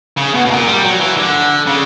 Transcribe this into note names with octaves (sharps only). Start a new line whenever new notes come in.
C#3
B2
B2
A#2
G3
F#3
E3
D3
C#3